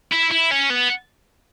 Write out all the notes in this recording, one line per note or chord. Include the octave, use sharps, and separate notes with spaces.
E4
E4
C#4
B3